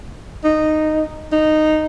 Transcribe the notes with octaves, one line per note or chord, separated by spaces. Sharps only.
D#4
D#4